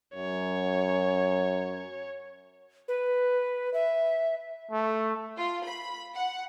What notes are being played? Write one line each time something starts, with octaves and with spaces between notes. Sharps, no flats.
F#2 C#5
B4
E5
A3
F4
B5
F#5